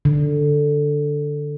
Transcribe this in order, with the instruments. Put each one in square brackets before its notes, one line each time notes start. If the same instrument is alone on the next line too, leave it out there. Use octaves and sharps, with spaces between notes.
[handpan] D3